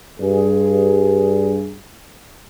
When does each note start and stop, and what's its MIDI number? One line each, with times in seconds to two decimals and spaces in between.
0.20 1.76 43
0.20 1.76 68